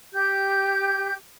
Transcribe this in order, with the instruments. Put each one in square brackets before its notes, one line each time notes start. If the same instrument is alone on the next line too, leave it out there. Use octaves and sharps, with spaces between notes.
[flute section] G4 G6